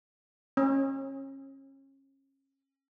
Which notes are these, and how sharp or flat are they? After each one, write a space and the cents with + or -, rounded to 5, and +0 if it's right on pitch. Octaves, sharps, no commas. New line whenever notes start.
C#4 -30